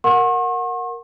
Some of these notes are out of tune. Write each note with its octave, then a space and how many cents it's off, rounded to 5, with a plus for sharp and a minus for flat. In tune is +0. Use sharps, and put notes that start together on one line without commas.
A#4 +0 F#5 -20 C#6 -45